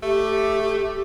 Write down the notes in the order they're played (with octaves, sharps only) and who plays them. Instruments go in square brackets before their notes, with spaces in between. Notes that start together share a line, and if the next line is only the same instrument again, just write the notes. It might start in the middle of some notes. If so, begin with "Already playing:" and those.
[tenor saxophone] A3 [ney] G4